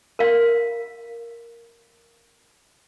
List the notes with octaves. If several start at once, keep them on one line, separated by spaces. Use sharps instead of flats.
A#4 F5